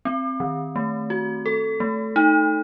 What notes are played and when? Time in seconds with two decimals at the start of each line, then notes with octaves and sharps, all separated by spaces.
0.05 C4
0.40 D#3
0.76 A3
1.10 F#4
1.46 A4
1.80 A3
2.16 D#4